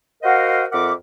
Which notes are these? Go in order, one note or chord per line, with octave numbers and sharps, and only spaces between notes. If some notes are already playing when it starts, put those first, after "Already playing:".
F#4 A#4 C5 D#5 F5 F#5
F2 A#4 E5 F#5 D6